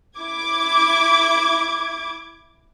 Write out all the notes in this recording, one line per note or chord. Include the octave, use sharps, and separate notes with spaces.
E4 D6 G#6